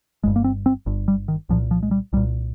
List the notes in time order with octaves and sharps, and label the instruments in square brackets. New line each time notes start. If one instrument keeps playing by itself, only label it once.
[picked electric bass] G1 G2 G#3
A#3
C4
C4
G1 G2
G3
D#3
C2 A#2 F3
F3
G#3
G3
C2 A#2 G3